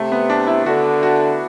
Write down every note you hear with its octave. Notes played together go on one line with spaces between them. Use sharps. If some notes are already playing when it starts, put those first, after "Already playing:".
Already playing: C3 A3
B3
D4
E4
D3 F#4
F#4